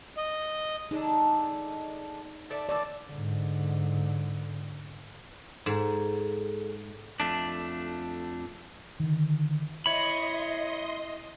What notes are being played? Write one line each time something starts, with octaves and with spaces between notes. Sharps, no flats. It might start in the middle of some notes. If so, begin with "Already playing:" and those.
D#5
G#3 D4 D#4 A4
A4 D5 E5
A2 E3 A4 D5
G#2 D3
G#2 G#4 A4
F2 A3 D4
D3 D#3
E4 C#5 D#5 E5 B5 C6